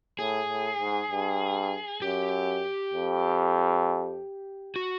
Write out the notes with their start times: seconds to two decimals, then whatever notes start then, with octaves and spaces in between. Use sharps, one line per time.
0.19 A2 G#4
0.49 A2
0.80 G#2
1.11 G2
2.02 F#2 G4
2.93 F2
4.76 F#4